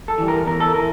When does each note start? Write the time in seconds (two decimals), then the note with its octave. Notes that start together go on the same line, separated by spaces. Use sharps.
0.08 A4
0.18 E3 G3
0.28 A#4
0.47 E2 A#4
0.60 A4
0.74 E3 A#4